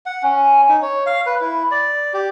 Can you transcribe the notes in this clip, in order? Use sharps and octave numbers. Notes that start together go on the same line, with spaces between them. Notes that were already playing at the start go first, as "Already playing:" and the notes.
F#5
C#4
D#4
C#5
F5
B4
E4
D5
G4